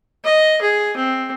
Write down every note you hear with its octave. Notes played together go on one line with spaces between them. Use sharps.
D#5
G#4
C4